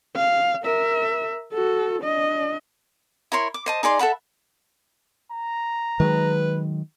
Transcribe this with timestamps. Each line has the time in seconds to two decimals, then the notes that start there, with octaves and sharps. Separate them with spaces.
0.16 F5
0.64 A#4 E5
1.52 F#4 A4
2.02 D4 D#5
3.32 E4 A#4 C#5 C6
3.54 D6
3.66 C5 D#5 A5
3.83 D#4 G#4 D5 C6
3.99 A4 E5 F#5 B5
5.32 A#5
6.00 D#3 F#3 G#3 B4